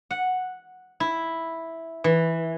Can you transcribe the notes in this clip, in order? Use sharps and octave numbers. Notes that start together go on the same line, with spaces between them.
F#5
E4
E3